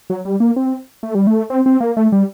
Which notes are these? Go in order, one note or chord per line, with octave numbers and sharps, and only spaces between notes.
F#3
G3
A#3
C4
A3
G3
A3
C4
C4
A#3
A3
G3